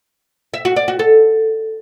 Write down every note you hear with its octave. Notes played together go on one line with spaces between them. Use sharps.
E5
F#4
D5
F#4
A4